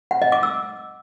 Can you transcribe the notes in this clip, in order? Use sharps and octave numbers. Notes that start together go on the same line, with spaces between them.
F#5
D#5
D6
E6